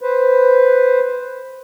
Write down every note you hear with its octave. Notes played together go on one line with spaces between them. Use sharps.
B4 C5